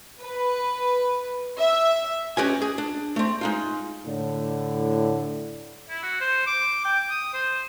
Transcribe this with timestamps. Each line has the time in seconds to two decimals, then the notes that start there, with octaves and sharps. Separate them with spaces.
0.21 B4
1.58 E5
2.37 C#4 G4 B4 D#5 G#5
2.62 G#4
2.78 D4
3.16 A3 C4
3.41 G#3 D#4 F4
4.06 A2 D3
5.90 E4
6.03 F#4
6.21 C5
6.47 D6
6.85 G5
7.10 D#6
7.34 C5